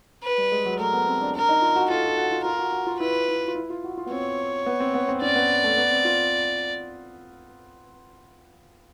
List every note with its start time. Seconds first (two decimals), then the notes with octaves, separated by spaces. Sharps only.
0.24 B4
0.38 G3
0.52 G#3
0.65 F#3
0.79 A3 A#4
0.93 B3
1.07 C4
1.21 D4
1.35 D4 A#4
1.49 D#4
1.62 F4
1.76 F#4
1.90 F4 A4
2.04 F4
2.17 F#4
2.32 F4
2.45 F4 A#4
2.59 F#4
2.72 F#4
2.87 F4
3.00 E4 B4
3.28 E4
3.48 F4
3.55 E4
3.70 F4
3.84 F#4
3.97 F4
4.06 B3
4.11 C4 C#5
4.66 B3
4.80 C4
4.94 B3
5.09 C4
5.21 C#4 D5
5.35 B3
5.64 A3
5.77 B3
5.91 C4
6.05 F4